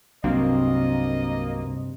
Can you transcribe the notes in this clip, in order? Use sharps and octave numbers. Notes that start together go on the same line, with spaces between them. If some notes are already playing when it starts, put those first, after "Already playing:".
C2 G2 C3 F#3 A#3 C4 D4 D#5